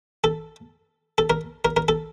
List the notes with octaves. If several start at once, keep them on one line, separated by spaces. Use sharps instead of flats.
A4
A4
A#4
A#4
A#4
A4